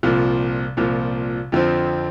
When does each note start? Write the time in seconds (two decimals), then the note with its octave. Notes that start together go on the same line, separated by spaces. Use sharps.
0.03 C2 A#2 F3
0.77 C2 A#2 F3
1.52 F2 D3 F3 C4